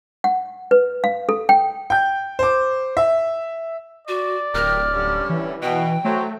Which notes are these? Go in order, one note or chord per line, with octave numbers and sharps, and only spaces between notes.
F#5
B4
F5
A4
G5
G5 G6
C5 D6
E5
F#4 D5
D1 G4 A#4 F6
D3 G3 C#4
E3
B2 G5
F#3 A3 C5